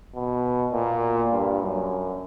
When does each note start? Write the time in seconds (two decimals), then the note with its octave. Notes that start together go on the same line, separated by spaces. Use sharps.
0.15 B2
0.73 A#2
1.32 G2
1.61 F#2